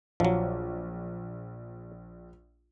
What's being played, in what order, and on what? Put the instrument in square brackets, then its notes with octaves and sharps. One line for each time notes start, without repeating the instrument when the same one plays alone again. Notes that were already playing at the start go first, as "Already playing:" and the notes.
[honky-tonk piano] A#1 [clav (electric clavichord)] F3 F#3